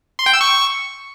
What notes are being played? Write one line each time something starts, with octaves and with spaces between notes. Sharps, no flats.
C6
G5
E6
C#6